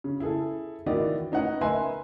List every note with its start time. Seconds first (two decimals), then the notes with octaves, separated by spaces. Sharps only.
0.04 C#3
0.20 E4 G#4 A4
0.86 D#3 E3 E4 F#4 D5 D#5
1.32 C#4 D#4 B4 F#5
1.61 A#4 B4 D#5 E5 G#5 C6